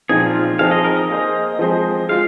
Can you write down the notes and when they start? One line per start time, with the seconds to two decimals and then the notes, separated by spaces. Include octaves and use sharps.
0.09 A#2 F3 C4 D#4 G#4 C5
0.26 F4
0.59 F3 C4 D#4 G#4 F5
0.71 D#5
0.84 A#4
0.97 D#5
1.10 A#3 G#4 C5
1.59 F3 G#3 C4 G#4 C5
2.09 G#3 F4 F5